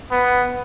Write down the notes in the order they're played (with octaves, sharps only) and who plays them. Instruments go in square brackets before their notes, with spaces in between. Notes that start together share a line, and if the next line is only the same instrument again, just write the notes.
[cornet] B3